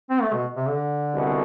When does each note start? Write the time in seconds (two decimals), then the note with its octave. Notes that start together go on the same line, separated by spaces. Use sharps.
0.10 C4
0.22 A3
0.33 B2
0.56 C3
0.67 D3
1.14 C2 B2